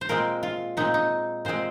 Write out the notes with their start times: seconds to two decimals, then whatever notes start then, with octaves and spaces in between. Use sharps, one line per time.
0.01 C5
0.09 A#2 G#3 C4 A#4
0.43 F4
0.77 A#2 G#3 C4 D#4
0.94 D#4
1.45 A#2 G#3 C4 C5